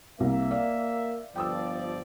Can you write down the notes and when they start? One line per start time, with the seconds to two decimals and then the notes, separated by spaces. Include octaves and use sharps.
0.20 C2 A#3 E5
0.51 D5 F5
1.36 G1 F3 D5 G5 D#6 E6